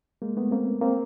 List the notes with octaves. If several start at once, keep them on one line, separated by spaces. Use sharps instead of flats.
G#3 A#3
A3 B3
A#3 C4
A#3 C4